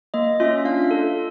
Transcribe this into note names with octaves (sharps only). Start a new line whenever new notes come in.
A#3 D#5
C#4 F4 E5
E5
D4 F5
F4 A4